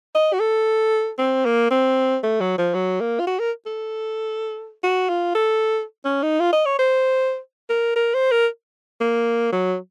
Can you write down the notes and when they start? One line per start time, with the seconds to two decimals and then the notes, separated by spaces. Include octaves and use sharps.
0.15 D#5
0.33 F#4
0.40 A4
1.19 C4
1.45 A#3
1.71 C4
2.24 A3
2.41 F#3
2.58 F3
2.75 F#3
3.01 A#3
3.20 F4
3.27 F#4
3.40 A#4
3.67 A4
4.84 F#4
5.09 F4
5.35 A4
6.05 C#4
6.23 D#4
6.40 F4
6.53 D#5
6.66 C#5
6.79 C5
7.70 A#4
7.96 A#4
8.14 C5
8.31 A#4
9.01 A#3
9.52 F#3